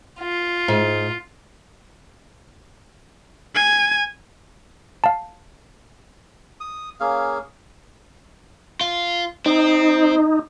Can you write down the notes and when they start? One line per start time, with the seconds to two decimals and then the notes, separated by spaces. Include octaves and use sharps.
0.20 F4
0.68 G#2
3.55 G#5
5.04 F5 A5
6.60 D#6
7.00 A#3 C#4 G#4 F5
8.81 F4
9.46 C4 D#4